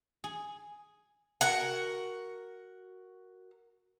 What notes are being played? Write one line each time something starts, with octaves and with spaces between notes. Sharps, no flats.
G#4
F#4 A#4 F#5